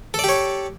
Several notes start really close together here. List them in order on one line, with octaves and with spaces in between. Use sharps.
A4 D5 G4 C#5